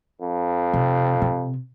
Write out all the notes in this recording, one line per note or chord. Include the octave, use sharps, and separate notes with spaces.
F2
C3
C3